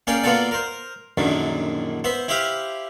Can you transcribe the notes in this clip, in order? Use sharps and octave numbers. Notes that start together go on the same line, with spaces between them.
A#3 C#4 G#4 D5 G5
A#3 B3 F4 F#4 A4 D5
A#4 C5
A#1 F#2 D3 D#3
B3 C5 E5
E4 G4 C5 E5 F5